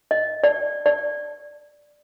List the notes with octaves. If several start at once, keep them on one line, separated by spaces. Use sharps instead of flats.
D#5
D5
D5